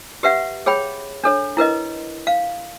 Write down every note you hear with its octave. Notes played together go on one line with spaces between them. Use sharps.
G4 B4 E5 F#5
G#4 C#5 G5 B5
D4 A4 C#5
E4 A#4 B4 D#5
F5